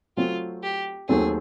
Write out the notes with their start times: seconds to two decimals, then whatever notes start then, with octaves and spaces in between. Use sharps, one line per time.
0.17 F#3 A3 C4 F4
0.63 G4
1.09 D#2 D#3 F#3 A3 C4 G#4